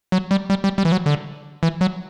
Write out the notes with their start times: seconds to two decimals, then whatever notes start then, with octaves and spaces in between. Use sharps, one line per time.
0.12 F#3
0.31 G3
0.50 G3
0.64 G3
0.78 G3
0.85 E3
0.92 F#3
1.06 D3
1.63 E3
1.81 F#3